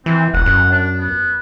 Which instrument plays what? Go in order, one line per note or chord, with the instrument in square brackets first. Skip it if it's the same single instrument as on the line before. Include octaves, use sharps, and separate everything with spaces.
[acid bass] E3 [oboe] C4
[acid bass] E1 [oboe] F#5
[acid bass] F#2
[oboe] D4
B3